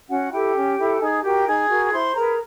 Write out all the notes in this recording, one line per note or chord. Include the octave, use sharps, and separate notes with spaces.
C#4 F#4 F#5
E4 G4 A4 G5
C#4
E4 A4
D#4 G#4 G#5
F#4 G4 A#4 G5
D#4 G#4 G#5
F#4 A#4
E4 C5 C6
G#4 A#4 B4 A#5